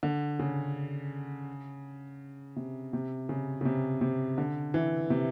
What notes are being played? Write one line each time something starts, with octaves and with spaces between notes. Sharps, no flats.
D3
C#3
C3
C3
C#3
C#3
C3
C3
D3
E3
C3